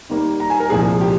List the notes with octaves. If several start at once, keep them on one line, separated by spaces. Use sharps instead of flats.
D#2 D#3 G3 A#3
A#5
G#5
A#4
C2 A#2 F3 G#3 G#4
G4